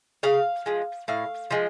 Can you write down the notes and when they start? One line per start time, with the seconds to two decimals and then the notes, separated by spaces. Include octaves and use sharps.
0.23 C#3 F5
0.66 F3 G#3
1.08 A2 F5
1.51 F3 G#3